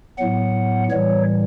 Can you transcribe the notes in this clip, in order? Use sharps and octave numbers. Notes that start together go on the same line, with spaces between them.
A2 F#3 B3 F#5
A2 E3 G3 C#5